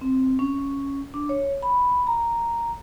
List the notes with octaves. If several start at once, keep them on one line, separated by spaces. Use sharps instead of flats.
C4
C#4
D4
C#5
B5
A#5